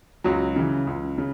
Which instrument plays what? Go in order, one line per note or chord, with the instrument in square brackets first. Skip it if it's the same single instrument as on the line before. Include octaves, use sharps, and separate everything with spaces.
[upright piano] C#2 [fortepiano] F#3
[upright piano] C#3 E3
C#2
C#3